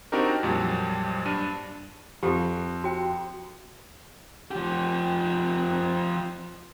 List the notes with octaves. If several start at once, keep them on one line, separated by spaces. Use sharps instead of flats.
C4 D4 D#4 F#4 G4 A#4
F2 A#2 F#3 G3
G2 D4 D#7
F2 G4
F#4 G5
F3 G4